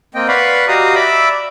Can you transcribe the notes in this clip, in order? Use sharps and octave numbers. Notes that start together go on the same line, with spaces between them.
A#3 C4 D#5 G5
B4 D5 F5 F#5 B5 C#6
F#4 G4 D#5 F5 A#5 D#6
D5 E5 B5 D6 E6